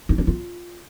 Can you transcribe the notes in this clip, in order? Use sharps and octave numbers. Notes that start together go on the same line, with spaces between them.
D#4
D4
F4